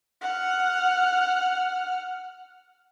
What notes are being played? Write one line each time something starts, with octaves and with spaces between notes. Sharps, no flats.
F#5 F6